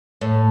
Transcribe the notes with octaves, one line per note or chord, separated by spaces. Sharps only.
A2